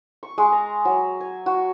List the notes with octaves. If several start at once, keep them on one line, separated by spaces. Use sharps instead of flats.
C#6
G#3
A#5
F#3
G#5
F#4